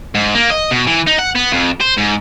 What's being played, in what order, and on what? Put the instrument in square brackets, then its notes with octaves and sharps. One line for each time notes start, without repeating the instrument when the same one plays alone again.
[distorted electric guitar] G#2
A#3
D#5
B2
E3
D#4
F#5
B3
F2
C5
G#2